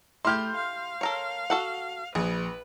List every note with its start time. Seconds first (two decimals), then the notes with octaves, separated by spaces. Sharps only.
0.25 A3 E4 G4 C6 F6 G6
0.56 F5
1.01 A4 A#4 C#5
1.50 F#4 A4 F#5
2.15 A#1 G#4 B4